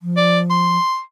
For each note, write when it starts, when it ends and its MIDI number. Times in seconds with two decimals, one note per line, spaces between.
0.01 0.78 53
0.17 0.39 74
0.50 1.00 84